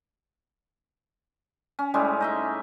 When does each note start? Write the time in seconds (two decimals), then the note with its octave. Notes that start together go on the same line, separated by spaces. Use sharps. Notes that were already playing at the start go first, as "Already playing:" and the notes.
1.79 C#4
1.94 A2 G3 G#3 C#4
2.21 D#4 D#5 E5